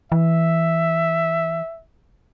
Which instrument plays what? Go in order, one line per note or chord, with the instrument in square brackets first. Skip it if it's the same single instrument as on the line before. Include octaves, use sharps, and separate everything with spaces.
[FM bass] E3 [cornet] E5